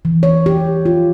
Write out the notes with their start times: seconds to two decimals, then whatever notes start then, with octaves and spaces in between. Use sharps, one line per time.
0.05 E3
0.23 C#5
0.46 G4
0.86 F4